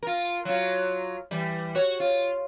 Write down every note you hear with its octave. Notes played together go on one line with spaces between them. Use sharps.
F4 A#4
F#3 F4
E3 G3
F#4 C#5
F4